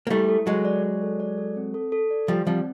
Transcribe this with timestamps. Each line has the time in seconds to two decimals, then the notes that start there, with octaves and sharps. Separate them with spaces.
0.07 A#3
0.10 G3 A3 E4
0.29 A4
0.47 F#3 G#3 A4
0.65 D5
0.83 D5
1.02 A4
1.20 D5
1.38 A4
1.56 C4
1.74 A4
1.92 A4
2.11 D5
2.28 F3 G3 D5
2.47 F3 G3 C4